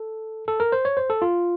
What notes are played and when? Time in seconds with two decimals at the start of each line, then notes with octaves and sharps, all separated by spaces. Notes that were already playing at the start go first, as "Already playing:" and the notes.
Already playing: A4
0.48 A4
0.60 A#4
0.72 C5
0.85 C#5
0.97 C5
1.10 A4
1.22 F4